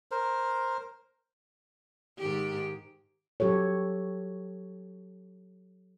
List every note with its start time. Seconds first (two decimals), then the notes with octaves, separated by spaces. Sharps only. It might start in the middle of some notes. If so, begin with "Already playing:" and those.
0.11 A#4 C5
2.18 G#2 D#3 G4
3.40 F#3 G4 A4 C#5